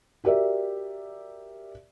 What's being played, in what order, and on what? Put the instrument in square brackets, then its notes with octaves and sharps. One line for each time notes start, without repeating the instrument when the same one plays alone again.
[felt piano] F#4 G4 A#4 D5 E5